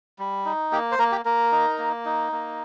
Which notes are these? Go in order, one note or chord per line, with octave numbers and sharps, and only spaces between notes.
G3
D#4
A#3 G4
C5
A#3 A#4
G4
A#3 A#4
D#4
A#3
D#4
A#3